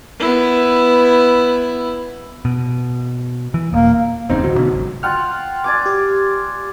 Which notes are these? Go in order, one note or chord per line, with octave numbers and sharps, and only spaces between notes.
B3 E4
B2
E3
D#1 A#3
F#1 E2 C#3 C4 D#4
D1 D2 F#3
B2 D3 B3
G#1 C#2
F4 F#5 G5 F6
D5 G#5 D6
G4